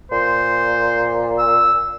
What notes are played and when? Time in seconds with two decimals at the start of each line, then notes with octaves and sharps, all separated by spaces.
0.12 A#2 C5
1.39 E6